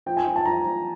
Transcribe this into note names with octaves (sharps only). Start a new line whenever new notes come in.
F3 G5
G#5
F3
A5
F3 A#5
F3